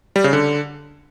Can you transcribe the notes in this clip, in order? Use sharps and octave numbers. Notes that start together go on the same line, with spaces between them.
G3
C#3
D3